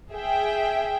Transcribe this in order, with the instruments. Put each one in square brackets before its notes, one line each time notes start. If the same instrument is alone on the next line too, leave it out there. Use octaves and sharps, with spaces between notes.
[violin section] G#4 E5 G5